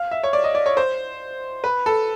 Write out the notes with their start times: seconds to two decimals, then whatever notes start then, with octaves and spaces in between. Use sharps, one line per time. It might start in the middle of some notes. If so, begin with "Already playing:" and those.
Already playing: F5
0.11 E5
0.23 C#5
0.33 D5
0.44 D#5
0.55 D5
0.66 C#5
0.77 C5
1.64 B4
1.86 A4